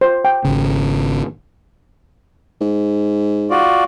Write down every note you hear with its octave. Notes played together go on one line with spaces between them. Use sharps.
C5
G5
G#1 C#3
G#2
F4 F#4 D5